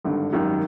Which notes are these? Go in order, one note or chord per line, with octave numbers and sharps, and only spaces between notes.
G#1 G2 D3
G#1 F#2 D#3 G3